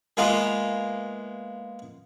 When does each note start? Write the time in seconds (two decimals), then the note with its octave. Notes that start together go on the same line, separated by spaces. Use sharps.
0.17 G#3 A#3 B3 F4 A#4 E5